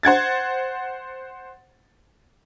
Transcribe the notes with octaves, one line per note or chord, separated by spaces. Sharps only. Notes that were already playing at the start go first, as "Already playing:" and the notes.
C5 F#5 G#6 A6